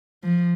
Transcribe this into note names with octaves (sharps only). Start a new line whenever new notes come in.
F3